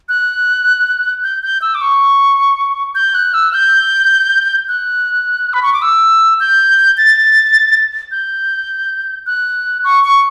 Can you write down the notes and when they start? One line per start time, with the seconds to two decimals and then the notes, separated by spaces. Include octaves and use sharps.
0.09 F#6
1.23 G6
1.43 G6
1.62 E6
1.75 D6
1.81 C#6
2.95 G6
3.15 F#6
3.34 E6
3.53 G6
4.68 F#6
5.53 B5
5.63 C#6
5.73 D6
5.82 E6
6.40 G6
6.98 A6
8.11 G6
9.26 F#6
9.84 C#6
10.04 C#6